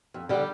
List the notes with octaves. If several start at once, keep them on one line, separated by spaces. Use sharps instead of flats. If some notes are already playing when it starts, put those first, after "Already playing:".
F2
D3 G3 G4